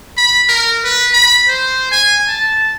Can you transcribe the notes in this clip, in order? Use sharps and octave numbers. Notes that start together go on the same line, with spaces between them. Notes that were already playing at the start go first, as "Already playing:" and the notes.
B5
A#4
B4
B5
C5
G#5
A5